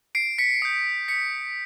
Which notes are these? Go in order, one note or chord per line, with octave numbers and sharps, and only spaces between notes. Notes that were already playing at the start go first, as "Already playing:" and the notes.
C7 D7
B6 C#7
D#6 G6 C7
B6 C#7